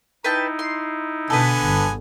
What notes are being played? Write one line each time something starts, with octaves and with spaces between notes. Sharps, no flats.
D#4 E4 B4 G5 A5
C6
B2 D3 B3 A4 B4 G#5
G1